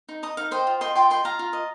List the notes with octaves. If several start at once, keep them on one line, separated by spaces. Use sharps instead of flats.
D#4
D#5 A#5 D#6
D#4 F5
C5 D#5 G5
F4
D#5 G5 C6
F4 G5 C6
D#5 G5 C6
F4 F5 A#5
F4
D#5